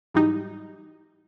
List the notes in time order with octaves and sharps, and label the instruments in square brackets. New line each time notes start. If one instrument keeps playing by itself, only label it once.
[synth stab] G#2 E3 F#3 G3 D#4